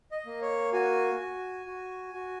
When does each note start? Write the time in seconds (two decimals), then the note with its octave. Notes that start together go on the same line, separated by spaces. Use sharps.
0.11 D#5
0.26 A#3
0.42 C#5
0.73 F#4 G#5
1.20 F#4
1.66 F#4
2.14 F#4